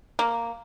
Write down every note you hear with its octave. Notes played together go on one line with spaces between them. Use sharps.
A#3